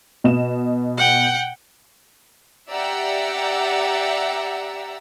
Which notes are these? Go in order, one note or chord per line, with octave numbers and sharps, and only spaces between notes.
B2 D#5 E7
F#5 G5
G4 D5 E5 F#5 A#5 E6